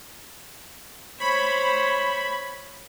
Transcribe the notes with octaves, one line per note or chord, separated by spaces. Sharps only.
C5 C#5 B5